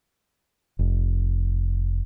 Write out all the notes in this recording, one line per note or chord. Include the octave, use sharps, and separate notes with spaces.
F1